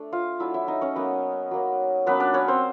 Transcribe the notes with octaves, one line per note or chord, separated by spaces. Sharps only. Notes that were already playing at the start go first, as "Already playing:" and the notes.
Already playing: A3 D4
F4 F5
F#3 A3 D4 E4 E5
E4 E5
D#4 D#5
C#4 C#5
F#3 A#3 B3 C#4 B4
F#3 A#3 C#4
F#3 A#3 B3 C#4 B4
D4 D5
C#4 C#5
C4 C5